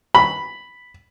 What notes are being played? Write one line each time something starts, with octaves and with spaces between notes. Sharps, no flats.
B5